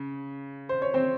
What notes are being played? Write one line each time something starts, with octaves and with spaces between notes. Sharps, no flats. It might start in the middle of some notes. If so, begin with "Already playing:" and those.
Already playing: C#3
C5
C#5
C4 C5